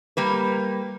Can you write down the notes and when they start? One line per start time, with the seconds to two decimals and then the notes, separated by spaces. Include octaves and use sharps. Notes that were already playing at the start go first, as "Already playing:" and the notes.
0.17 G3 A#3 B4